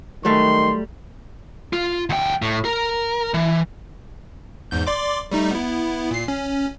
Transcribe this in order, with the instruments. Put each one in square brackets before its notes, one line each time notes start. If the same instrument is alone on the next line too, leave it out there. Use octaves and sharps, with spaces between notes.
[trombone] D#3 [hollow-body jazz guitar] F#3 G3 A3 [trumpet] C6
[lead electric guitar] F4
D2 G5
A2
A#4
E3
[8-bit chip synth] E2 G#2 G6
D5 C6 D6
G3 A3 D#4
B3 E4
A#2 C7
C#4